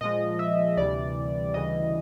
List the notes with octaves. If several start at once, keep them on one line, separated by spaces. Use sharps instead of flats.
A#2 F3 G#3 D#5
E5
D2 C3 E3 G3 D5
D2 C#3 E3 G3 D#5